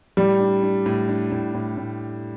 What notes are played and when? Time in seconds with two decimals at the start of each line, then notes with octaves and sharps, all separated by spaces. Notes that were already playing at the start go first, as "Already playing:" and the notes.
0.17 A2 G3
0.40 D4
0.63 D4
0.86 A2
1.09 D4
1.32 A2
1.54 A2
1.77 A2